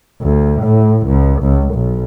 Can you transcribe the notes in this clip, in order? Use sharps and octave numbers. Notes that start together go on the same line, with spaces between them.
D2
A2
C#2
C#2
B1